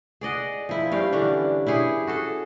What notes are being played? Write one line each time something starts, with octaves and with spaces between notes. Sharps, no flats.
G#4 D5 D#5 F#5
F3 E4
G2 C#4 F5 G5
D3 E3 C#4 D4
E4 G4 G#4 C#5
F#4 G#4 A4